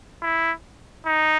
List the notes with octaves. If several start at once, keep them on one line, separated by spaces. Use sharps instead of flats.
E4
D#4